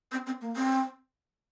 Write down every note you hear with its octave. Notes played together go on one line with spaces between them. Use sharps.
C4
C4
A#3
C4